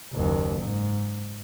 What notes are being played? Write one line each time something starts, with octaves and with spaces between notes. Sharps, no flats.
F#1 D#2
G#2